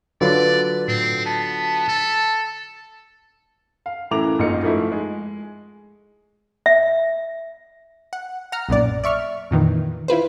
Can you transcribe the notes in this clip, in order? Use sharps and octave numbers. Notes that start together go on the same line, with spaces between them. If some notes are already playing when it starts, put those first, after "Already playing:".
D3 F#3 F4 B4 D5
A2 C4
B3 A5
A4
F5
F#2 A2 E3 A#5 D6 F7
A1 G#2 A#3 D#4 F4 C#7
G#2 F3 A3 E4
G#3
E5
F#5
F#5 A#5 F6
B1 F#2 A#2 D5
D5 E5 C#6 F6
F2 A#2 D#3 E3
E4 F4 B4 C5